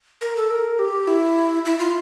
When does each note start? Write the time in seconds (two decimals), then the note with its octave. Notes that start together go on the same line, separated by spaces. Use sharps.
0.21 A#4
0.36 A4
0.51 A#4
0.79 G4
1.07 E4
1.65 E4
1.79 F4